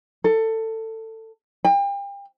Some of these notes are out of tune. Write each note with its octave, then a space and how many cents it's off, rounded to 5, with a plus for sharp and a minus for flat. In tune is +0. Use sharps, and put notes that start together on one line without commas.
A4 +20
G5 +35